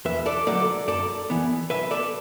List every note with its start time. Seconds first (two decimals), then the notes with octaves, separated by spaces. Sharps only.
0.05 E2 B4 E5
0.26 A4 D5
0.47 D3 F#3 A3 A4 D5
0.88 F#2 A4 D5
1.30 E3 B3
1.70 B1 B4 E5
1.91 A4 D5